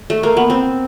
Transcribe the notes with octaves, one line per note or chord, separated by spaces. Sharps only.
A3
A#3
B3
C4